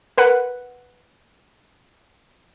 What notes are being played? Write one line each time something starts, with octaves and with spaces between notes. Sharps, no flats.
A#4 B4 F#5